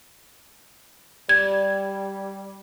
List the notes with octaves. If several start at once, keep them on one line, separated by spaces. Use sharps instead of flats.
G3 G#6